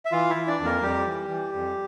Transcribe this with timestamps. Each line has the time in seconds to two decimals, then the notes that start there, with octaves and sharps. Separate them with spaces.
0.05 E5
0.12 E3 F4 F5
0.30 E4 E5
0.36 E3
0.47 D4 D5
0.59 F2
0.65 A#3 A#4
0.82 F2 G3 G4
1.06 E3
1.29 E3
1.54 F2